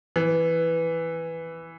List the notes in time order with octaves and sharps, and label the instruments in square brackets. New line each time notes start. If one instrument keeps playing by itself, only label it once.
[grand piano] E3